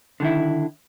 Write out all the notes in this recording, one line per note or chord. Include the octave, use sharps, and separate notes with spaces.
D3 D#3 E4